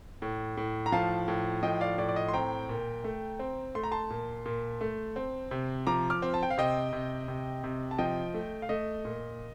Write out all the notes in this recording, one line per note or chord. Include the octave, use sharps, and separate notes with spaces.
A2
A2
A#5
F3 F5 A5
A2
F3 D#5 G5
D5 F5
A2 D5
D5
D#5
C6
C4 G5 A#5
A#2
A3
C4
A3 C6
A#5
A5 C6
A#2
A#2
A3
C4
C3
F3 A#5 D6
D6 F6
C4
A5
G5
F5
C3 D#5 G5
C3
C3
C3
A5
F3 D#5 G5
A3
F5
A3 D#5
A#2